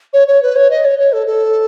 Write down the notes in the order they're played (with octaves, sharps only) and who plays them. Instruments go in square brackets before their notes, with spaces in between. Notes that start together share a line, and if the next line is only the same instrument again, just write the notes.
[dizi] C#5
C#5
B4
C#5
D#5
C#5
C#5
A4
A4